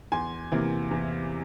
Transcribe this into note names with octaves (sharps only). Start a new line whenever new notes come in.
E2 G#5 C6
C3 E3 A#3
E2